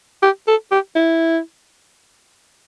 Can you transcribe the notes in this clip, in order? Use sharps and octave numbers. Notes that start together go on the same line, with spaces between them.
G4
A4
G4
E4